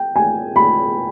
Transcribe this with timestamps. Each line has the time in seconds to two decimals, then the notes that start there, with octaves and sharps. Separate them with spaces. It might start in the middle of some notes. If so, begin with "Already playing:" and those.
Already playing: G5
0.16 G#5
0.56 B5